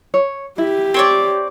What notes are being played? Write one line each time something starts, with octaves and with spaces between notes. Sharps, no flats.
C#5
E4 G4
C4 C#5 D5